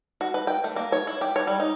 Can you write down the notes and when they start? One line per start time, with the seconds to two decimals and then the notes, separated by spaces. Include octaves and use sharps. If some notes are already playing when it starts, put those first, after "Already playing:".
0.21 F#4
0.34 B4
0.47 G5
0.64 A3
0.76 A#3
0.92 C#5
1.07 E4
1.21 G4
1.36 C#5
1.47 G3
1.60 D#4